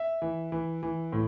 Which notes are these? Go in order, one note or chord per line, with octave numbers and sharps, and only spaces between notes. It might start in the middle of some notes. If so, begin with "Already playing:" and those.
Already playing: E5
E3
E3
E3
A2